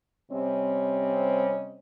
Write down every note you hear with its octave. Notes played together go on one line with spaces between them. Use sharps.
C3 G3 C4 C#4 C#5 D#5